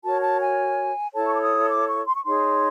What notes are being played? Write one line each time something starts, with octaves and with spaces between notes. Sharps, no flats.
F#4 A#4 C#5 A5
A5
G#5
E4 A4 C#5 A5
C#6
D6
D#6
D6
C#6
C6
C#6
D#4 G#4 C#5 C6